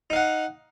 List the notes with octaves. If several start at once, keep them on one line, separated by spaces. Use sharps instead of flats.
D#4 F5 F#5